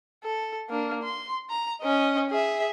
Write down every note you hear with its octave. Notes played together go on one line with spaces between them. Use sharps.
A4
A#3 D4
C6
A#5
C#4 D#5
G#4 E5